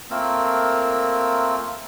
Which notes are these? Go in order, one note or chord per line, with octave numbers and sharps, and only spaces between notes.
A3 A#3 C4 F4 A#4 E6